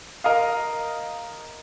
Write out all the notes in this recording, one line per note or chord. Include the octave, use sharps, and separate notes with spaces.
A#4 D#5 F5